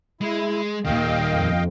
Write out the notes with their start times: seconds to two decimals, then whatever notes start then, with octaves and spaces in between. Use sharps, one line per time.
0.21 G#3 E4
0.85 D#2 A#2 D#3 D#5 F5 G5
1.32 F2